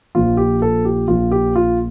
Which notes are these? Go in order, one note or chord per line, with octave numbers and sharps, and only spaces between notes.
A#1 A#2 F3 F4
G4
A4
G4
A#1 A#2 F3 F4
G4
F4